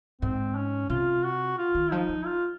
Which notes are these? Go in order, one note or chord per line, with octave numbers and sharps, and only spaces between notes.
G#2 C4
C#4
C3 F4
F#4
F4
D#3
F3 D#4
F3
F4